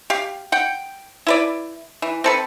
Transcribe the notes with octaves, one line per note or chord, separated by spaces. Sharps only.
G4 F5
F#5 G5
E4 B4 D5
E3
C4 A4 B4